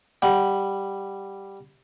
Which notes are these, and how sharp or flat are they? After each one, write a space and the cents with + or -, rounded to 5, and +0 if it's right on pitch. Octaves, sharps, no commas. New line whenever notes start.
G3 +0 F#5 +0